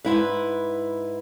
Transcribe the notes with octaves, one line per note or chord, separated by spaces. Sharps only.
G#2 E4 B4